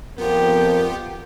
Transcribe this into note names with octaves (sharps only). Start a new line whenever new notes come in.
F2 B3 F4 G4 A#4